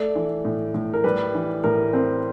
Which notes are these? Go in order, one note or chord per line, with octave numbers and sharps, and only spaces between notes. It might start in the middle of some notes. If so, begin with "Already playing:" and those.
Already playing: A3 D5
E3
A2
A2
A#4
G3 B4
E3
A2 A#4
C4